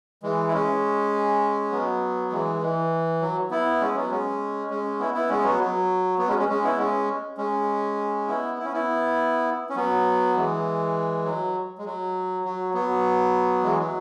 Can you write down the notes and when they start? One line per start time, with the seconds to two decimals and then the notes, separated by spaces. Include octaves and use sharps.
0.23 E3 G#3
0.48 E4
0.53 G#3 C#4
1.72 F#3 B3
2.31 E3 G#3
2.62 E3
3.21 F#3
3.51 B3 E4
3.80 G#3 C#4
3.95 F#3 B3
4.10 G#3 C#4
4.70 G#3 C#4
4.99 B3 E4
5.14 B3 E4
5.29 G#3 C#4
5.44 F#3 B3
5.59 F#3
6.18 F#3 B3
6.28 G#3 C#4
6.38 G#3 C#4
6.48 G#3 C#4
6.63 B3 E4
6.78 G#3 C#4
7.37 G#3 C#4
8.27 B3 E4
8.58 E4
8.65 C#4
8.73 B3 E4
9.70 C#4
9.76 F#3 B3
10.36 E3 G#3
11.25 F#3
11.78 G#3
11.85 F#3
12.44 F#3
12.74 F#3 B3
13.63 E3 G#3
13.78 F#3